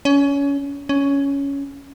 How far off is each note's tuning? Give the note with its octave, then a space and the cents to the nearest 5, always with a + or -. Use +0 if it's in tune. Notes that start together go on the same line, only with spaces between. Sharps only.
C#4 +25
C#4 +10